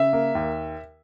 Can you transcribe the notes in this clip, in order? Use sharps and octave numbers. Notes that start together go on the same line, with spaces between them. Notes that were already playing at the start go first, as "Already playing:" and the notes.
Already playing: C#3 E5
A#3
D#2